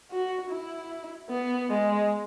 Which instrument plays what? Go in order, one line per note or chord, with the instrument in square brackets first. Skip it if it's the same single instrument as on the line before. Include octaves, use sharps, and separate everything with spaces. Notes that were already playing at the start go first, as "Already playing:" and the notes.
[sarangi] F#4
E4
B3
G#3